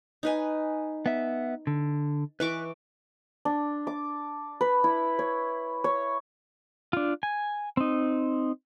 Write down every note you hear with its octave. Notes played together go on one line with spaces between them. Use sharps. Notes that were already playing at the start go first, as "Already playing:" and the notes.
D#4 B4 G#5
B3 E5
D3
E3 B4 C#6 D6
D4
D6
B4
E4
C#5
C#5
D4 F4
G#5
C4 D#4